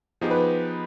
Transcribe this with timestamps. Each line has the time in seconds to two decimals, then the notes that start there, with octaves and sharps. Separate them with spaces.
0.21 F3 B3 D#4 G4 G#4
0.31 B4